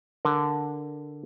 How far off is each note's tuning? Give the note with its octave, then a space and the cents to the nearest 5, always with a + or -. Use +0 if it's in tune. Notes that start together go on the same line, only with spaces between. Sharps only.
D3 +0 A#4 +5